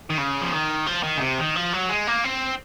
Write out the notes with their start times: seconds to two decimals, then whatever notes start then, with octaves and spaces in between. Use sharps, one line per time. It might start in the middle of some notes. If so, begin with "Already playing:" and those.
0.10 D#3
0.18 C#3
0.41 F3
0.52 D#3
0.87 F3
1.03 D#3
1.17 C#3
1.21 C3
1.39 D#3
1.56 F3
1.73 F#3
1.89 G#3
2.07 A#3
2.24 C4